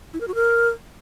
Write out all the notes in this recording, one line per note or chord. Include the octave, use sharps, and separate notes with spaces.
E4
A#4
F#4
A#4